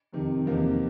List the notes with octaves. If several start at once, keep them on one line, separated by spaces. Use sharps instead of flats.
F2 C3 D#3
E2 C3 F3 A#3 D#4